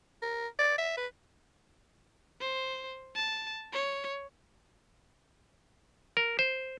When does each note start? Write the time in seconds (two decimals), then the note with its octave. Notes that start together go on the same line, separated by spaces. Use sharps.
0.22 A#4
0.59 D5
0.78 E5
0.97 B4
2.41 C5
3.15 A5
3.73 C#5
6.17 A#4
6.39 C5